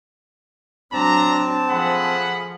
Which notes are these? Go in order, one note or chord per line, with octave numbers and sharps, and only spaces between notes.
F#3 C4 D4 A5 A#5
F3 A3 G#4 F#5 B5